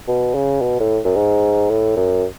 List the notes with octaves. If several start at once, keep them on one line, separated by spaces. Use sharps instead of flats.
B2
C#3
B2
A2
F#2
G#2
A2
F#2